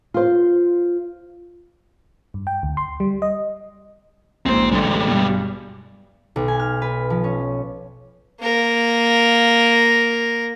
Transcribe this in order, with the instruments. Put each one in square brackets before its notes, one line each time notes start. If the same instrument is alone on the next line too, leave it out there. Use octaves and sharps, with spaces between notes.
[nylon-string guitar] F4 C5
[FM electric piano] G2
G5
D2
C6
G3
D#5
[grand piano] A#1 G#2 [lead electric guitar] C4 C5
[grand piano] A1 D3 [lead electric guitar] G3 G#3
[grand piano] G2 B2
[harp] B1
G#5
F6
B4
F3
C#4
[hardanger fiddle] A#3 A#4